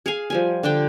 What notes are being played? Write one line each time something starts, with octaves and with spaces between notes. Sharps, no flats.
G#4 F5 G#5
F3 G3 G#5
D3 D4 G5